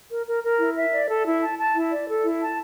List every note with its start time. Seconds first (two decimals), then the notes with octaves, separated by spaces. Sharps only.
0.11 A#4
0.27 A#4
0.43 A#4
0.60 E4
0.76 E5
0.92 D5
1.09 A4
1.26 E4
1.42 A5
1.59 A5
1.75 E4
1.91 D5
2.08 A4
2.24 E4
2.41 A5